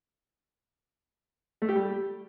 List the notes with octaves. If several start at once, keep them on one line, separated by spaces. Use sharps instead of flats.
A3
G4
G3